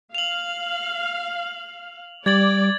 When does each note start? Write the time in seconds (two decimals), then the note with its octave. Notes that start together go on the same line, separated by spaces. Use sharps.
0.15 F5 F7 F#7
2.26 G3 D5 G#6 A6 F#7